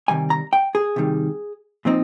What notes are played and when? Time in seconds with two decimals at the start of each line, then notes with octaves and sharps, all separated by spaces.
0.08 C3 D#3 G3 G#5
0.30 A#5
0.53 G5
0.75 G#4
0.96 C3 D#3 G3
1.85 A#2 F3 C4 D#4